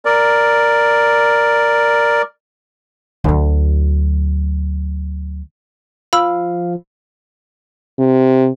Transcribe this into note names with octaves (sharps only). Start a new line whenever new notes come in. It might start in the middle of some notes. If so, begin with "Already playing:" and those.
A#4 D5
D2 F#3
F3 F5 B5 E6
C3